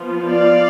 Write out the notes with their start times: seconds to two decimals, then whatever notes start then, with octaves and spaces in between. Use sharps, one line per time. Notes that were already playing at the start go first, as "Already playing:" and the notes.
Already playing: F3 B3 F4
0.27 D5 F5